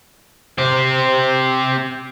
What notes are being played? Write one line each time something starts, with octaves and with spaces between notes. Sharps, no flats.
C4 G4